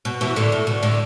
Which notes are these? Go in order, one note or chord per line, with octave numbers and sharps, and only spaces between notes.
B2
B2 E3
A2 D3
A2
B2
A2 D3